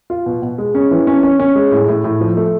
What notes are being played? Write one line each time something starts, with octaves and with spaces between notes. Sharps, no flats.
F4
B2
B2
G#3
C#4
E3
C#4
C#4
C#4
G#3
A2
A2
A2
F3
A3